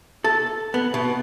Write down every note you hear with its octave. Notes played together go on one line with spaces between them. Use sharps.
A4
B3
B2